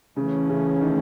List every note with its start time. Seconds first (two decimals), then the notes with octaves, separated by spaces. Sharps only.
0.16 C#3 E3 A3 C#4
0.49 C#3
0.81 D#3